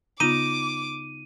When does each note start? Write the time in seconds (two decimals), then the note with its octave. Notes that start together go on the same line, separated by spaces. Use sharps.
0.20 C#3 B3 D#4 F4 D6 D#7